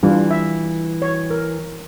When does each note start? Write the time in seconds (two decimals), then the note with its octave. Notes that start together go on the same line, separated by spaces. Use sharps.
0.03 E3 G3 D4 F4
0.31 E5
1.02 C#5
1.31 A#4